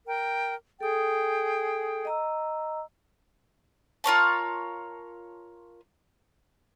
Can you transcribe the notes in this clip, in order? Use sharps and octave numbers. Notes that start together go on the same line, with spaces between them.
A#4 G5
G#4 A4 G5 D#6
D#5 A#5 E6
F4 A#4 C#5 A5